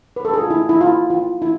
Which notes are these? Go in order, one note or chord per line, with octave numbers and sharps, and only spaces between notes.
B4
A4
G#4
F4
E4
E4
F4
F4
E4